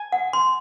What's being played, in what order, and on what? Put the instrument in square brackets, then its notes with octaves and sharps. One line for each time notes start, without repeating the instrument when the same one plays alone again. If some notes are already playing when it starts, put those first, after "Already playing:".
Already playing: [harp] G#5
[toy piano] F#5
C6